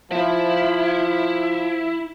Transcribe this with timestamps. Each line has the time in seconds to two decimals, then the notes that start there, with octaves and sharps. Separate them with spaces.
0.12 F3 E4